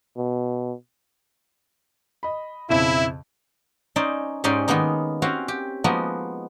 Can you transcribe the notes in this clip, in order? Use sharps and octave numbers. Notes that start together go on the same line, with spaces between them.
B2
D#5 B5
B1 F2 C#3 E4
C#4 D#4 C5 D5
G#2 C#4 D#4 G4 D5 C6
D#3 G#3 A#3 B3 D#4
C4 C#4 F#4 G4 F5
G4
F3 G#3 A#3 B3 D#4 F#4